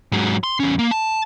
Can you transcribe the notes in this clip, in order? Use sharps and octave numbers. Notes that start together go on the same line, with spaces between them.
G#2 F#3
C6
E2 C#4
A#3
A5